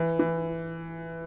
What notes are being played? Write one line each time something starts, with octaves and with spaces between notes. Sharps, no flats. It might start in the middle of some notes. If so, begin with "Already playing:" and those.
Already playing: E3
E3